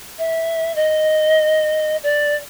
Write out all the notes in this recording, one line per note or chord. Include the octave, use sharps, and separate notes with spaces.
E5
D#5
D5